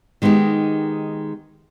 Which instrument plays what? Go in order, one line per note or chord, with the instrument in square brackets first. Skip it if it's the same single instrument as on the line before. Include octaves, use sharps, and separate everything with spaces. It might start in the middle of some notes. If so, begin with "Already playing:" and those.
[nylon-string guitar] D#3 G#3 B3 D#4 G4